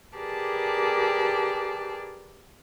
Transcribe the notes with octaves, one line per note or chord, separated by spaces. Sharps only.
G4 G#4 A#4 B4 D5 A5